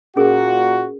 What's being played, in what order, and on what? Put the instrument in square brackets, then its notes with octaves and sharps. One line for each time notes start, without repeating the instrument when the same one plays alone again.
[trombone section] A#2 F#4 [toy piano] C#4 G#4 A#4